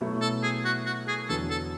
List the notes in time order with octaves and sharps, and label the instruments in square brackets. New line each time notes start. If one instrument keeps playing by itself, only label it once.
[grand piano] B2 F#3 A3 E4
[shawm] A4
G#4
F#4
F#4
G#4
[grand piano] E2 D3 F#3 [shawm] A4
[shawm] A4